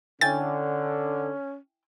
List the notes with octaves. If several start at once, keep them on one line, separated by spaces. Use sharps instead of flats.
D3 C#4 E4 G5 G#5 A6